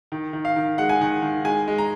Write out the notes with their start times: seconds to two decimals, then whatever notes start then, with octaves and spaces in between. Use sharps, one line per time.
0.12 D#3
0.33 D#3
0.45 F5
0.56 D#3
0.78 G#3 F#5
0.89 G#5
1.01 D#3 F#5
1.22 D#3
1.45 G#3 G#5
1.68 G#3
1.78 A#5